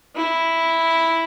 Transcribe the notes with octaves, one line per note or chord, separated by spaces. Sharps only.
E4